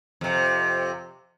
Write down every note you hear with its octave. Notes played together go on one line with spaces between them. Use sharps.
F2 C3